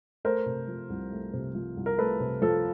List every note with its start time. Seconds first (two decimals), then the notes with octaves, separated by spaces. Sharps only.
0.25 A3 A#4 C5
0.46 C3
0.68 F3
0.90 C2
1.11 A3
1.33 C3
1.55 F3
1.77 C2
1.86 A#4
1.98 A3 A4 B4
2.20 C3
2.42 F3 A4